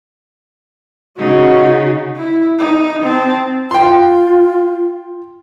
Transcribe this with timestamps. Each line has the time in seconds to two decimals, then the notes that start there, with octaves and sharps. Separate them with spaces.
1.18 C#3 D#4 F#4
2.17 E4
2.59 D#4
3.02 C4 A5
3.71 F4 G5 C6